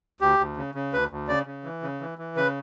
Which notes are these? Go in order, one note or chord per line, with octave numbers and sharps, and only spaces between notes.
D2 G4
D2
C#3
C#3
D2 B4
D2
C#3 D5
C#3
E3
C#3
E3
E3
C#3 B4